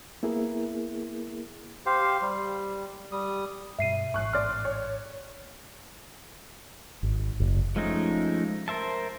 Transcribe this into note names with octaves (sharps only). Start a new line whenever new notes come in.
A#3 B3 E4 G#4 A#4
G4 C5 F5
G3
G3 D#6
G2 B2 E5 C7 D#7
A1 G#2 C#6 F#6
D5 C6 F6
C#5
G#1
F#1
F3 G#3 A3 C#4 D#4
A#4 C5 E5 A5